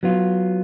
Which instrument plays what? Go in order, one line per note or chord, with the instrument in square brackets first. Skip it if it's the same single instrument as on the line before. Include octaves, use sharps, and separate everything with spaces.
[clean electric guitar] F#3 B3 F4